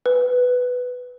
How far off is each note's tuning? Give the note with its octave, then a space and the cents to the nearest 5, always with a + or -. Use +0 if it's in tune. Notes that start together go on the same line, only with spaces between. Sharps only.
B4 +5